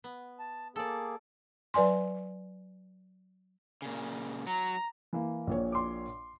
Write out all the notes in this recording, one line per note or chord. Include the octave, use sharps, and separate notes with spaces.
B3
A5
A#3 G#4 A4 D5
F#3 B4 D5 G#5 C6
A#2 C#3
F#3 A#5
E3 A#3
A#1 A#2 C#5
C6 D6